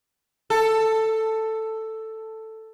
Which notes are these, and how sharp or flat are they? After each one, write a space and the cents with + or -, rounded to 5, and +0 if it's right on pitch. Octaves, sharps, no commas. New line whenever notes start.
A4 +5